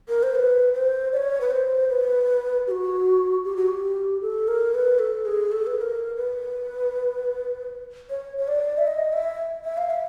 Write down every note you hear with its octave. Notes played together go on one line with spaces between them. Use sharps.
A#4
C5
B4
C5
D5
C#5
B4
C5
B4
G4
F#4
G4
F#4
G4
A4
A#4
B4
A4
G#4
A4
B4
B4
A#4
B4
C#5
C#5
D5
E5
D#5
E5
E5
F5
E5